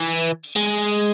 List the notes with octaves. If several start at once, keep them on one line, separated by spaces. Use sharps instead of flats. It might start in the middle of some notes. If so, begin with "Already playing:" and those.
Already playing: E3
G#3